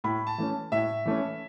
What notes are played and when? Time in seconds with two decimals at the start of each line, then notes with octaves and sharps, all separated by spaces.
0.04 A2 B5
0.27 A5
0.38 E3 A3 C#4
0.72 A2 E5
1.05 E3 A3 C#4